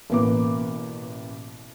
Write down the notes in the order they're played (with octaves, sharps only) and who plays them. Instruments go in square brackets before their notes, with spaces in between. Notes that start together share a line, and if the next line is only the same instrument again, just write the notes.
[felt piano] A1 B2 A#3 B4 D6